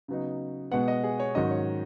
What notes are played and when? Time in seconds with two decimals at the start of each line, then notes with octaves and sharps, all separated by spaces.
0.08 C#3 F#3 B3 D#4
0.71 B2 G#3 B3 F#5
0.88 D#5
1.04 G#4
1.20 C#5
1.35 G#2 D#3 F#3 C#4 D#5
1.51 C#5